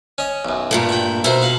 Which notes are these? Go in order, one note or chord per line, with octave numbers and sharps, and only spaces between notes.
C#4 D#5
B1 F#2
G2 A#2 A3
F#4 G5
B2 D#4 E4 A#4 C5
F#4 F5 F#5